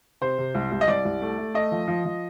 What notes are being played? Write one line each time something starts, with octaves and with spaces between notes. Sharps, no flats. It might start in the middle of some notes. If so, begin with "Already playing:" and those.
C3 C5
C3
C2
C2
D#5
C2 D5
C2
A3
A3
A3 D#5
F3
F3
F3